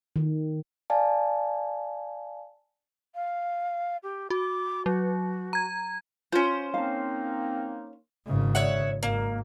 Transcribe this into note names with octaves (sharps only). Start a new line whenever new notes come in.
D#3
D5 F5 G#5 A5
F5
G4
F#4 D6
F#3 F#4
A#5 G#6
C#4 F4 C5
A#3 C4 D#4 F5 A5
G#1 C#3
C#5 E5 F#5
G#1 A#3